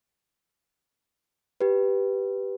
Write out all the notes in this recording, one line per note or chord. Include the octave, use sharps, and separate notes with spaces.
G4 B4